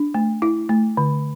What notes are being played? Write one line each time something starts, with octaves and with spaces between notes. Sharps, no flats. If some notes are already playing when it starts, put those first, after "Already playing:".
Already playing: D4
A3
E4
A3
D3